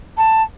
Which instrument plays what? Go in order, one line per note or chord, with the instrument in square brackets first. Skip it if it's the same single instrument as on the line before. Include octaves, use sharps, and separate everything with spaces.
[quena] A5